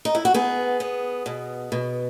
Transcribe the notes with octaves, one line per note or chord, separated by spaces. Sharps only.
D#4
E4
F#4
B3 G#4
B3
B2
B2